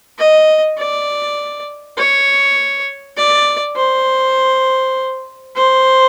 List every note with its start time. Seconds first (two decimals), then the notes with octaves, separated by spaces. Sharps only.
0.18 D#5
0.77 D5
1.98 C#5
3.17 D5
3.76 C5
5.56 C5